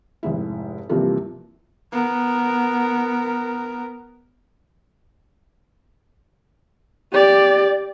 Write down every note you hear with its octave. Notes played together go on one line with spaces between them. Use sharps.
F1 G#2 E4
G2 C3 E3 F3 A#3 F4
B3 A#4
G4 D5